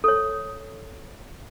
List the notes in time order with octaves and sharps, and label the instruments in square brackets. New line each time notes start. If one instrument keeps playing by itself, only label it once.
[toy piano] A4 C#5